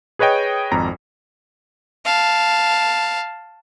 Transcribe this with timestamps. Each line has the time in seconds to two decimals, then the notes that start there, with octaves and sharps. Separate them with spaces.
0.19 G#4 B4 C#5 D#5 G5
0.71 G#1 F2 A#5
2.05 F5 A5